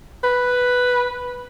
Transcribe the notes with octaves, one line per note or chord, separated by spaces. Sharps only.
B4